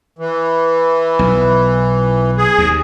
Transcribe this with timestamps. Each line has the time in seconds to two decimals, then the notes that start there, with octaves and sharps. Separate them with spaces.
0.19 E3
1.19 B1
2.38 G#4
2.58 D#2